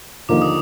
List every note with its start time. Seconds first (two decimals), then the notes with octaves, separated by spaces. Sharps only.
0.29 D#2 D3 F3 A#3 D#4 D6
0.42 D#6